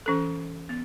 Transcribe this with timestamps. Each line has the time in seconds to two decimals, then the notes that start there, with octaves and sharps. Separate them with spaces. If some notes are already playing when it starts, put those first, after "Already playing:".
0.06 E3 C#4 A4
0.69 B3